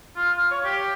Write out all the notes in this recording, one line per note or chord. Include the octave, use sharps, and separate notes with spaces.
F4
F5
C#5
G4